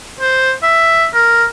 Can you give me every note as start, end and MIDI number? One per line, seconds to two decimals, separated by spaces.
0.21 0.53 72
0.63 1.07 76
1.14 1.46 70